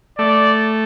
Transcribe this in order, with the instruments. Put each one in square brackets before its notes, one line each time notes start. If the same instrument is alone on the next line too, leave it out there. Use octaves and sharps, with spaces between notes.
[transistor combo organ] A3 [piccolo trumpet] D5